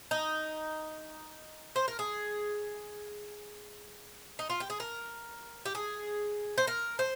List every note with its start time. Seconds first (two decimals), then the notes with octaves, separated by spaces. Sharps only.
0.11 D#4
1.76 C5
1.88 A#4
1.99 G#4
4.39 D#4
4.50 F4
4.60 G4
4.70 G#4
4.80 A#4
5.66 G4
5.75 G#4
6.58 C5
6.67 A#4
6.99 C5